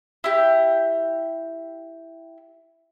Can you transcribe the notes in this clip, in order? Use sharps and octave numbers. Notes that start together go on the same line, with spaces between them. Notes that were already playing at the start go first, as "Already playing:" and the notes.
E4 G4